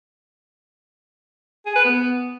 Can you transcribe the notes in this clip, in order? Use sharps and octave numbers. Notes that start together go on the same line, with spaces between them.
G#4
B4
B3